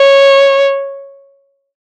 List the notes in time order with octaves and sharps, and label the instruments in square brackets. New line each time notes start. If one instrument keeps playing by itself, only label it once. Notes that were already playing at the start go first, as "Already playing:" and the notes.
Already playing: [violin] C#5